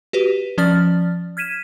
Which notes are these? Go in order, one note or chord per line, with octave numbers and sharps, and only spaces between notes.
F#4 G4 B4
F3 C#4 D5 F6 A6
F6 G#6 B6 D#7 E7